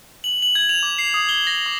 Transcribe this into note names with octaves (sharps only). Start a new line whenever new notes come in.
F#7
F#7
G#6
F7
D6
C7
D#6
G7
A#6
D6